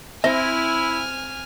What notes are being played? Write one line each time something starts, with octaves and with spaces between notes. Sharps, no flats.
C4 E4 E5 G#5 F6